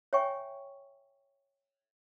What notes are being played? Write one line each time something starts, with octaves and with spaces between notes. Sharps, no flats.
C#5 E5 G5 G#5 C#6